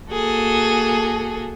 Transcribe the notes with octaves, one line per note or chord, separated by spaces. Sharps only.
A#3 F#4 G#4 A4